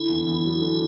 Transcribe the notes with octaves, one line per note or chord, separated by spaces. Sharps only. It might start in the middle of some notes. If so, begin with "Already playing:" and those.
Already playing: D3 E4
E2
E2
F#3
D3